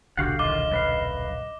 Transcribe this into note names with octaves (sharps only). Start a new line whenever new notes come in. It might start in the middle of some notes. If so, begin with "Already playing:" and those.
D#1 B1 D3 F#4 G4 F5 F#5
F#2 D#3 F4 D#5 D6 G7
F#2 B4 F5